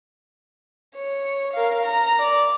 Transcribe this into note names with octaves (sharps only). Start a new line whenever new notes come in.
C#5
A#4 F5
A#5
D5